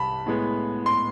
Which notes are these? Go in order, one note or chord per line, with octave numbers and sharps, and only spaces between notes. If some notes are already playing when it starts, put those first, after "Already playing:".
Already playing: C2 C3 A5 B5
A2 G#3 B3
C6